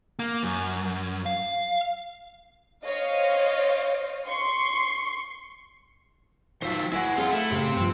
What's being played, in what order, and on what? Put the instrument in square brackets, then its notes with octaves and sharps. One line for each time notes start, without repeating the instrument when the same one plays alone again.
[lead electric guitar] A#3
F#2
F5
[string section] C5 C#5 D#5 F5
C6 C#6 C7
[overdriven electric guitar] D#3 E5 [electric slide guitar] F#3 C5 [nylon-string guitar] F4 F5
[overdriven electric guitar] F#3 G#3 [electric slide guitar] E4 [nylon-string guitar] B4 E5 F#5
[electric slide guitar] C4 C#5 F#5 [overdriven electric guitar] F4 [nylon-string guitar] G#4
[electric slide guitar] A3 [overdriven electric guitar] E4
[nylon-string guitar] A2 C#3 F5 [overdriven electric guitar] C4 [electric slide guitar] G4 C5
[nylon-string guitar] G2 F3 [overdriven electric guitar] C4